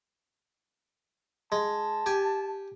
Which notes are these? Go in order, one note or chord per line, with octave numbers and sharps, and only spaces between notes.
G#3 A5
G4 G#5